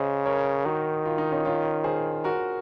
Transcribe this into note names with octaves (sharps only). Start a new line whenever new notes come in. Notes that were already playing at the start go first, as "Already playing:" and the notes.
Already playing: C#3 C5 D#5
A#4 C#5
D#3 D#4 F#4
F4
D#4
C#4 F4
C#4 F4
G#4 C5
F#4 A#4